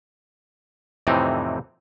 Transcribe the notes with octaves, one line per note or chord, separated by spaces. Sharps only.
F2 A2 C3 E3 C4 D#4